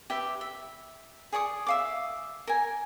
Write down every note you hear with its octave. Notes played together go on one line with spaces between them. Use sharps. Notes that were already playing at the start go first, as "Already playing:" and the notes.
G4 B4 E5
E5
G#4 D5 C#6 D#6
E5 F5 D6
A#4 G#5